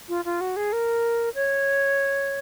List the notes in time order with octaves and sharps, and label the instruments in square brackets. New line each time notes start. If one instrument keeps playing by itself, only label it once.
[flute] F4
F4
F#4
G#4
A#4
C#5